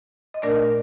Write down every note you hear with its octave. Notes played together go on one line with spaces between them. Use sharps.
D#5
A#2 A3 D4 A#4 D5